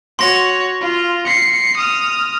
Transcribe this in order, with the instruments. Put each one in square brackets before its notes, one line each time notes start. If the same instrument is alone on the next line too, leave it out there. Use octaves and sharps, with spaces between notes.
[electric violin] F#4 C#5 [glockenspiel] C6 A#6
[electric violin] F4
C7 C#7
D#6 F6